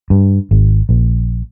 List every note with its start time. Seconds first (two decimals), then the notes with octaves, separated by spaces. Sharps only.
0.10 G2
0.51 G#1
0.89 A#1